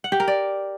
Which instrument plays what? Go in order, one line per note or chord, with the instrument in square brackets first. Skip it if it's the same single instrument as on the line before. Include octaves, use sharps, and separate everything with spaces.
[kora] F#5
G4
A#4
D5